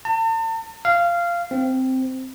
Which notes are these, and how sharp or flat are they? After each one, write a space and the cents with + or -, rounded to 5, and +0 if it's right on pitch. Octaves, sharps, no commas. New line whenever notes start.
A5 +40
F5 -15
C4 -5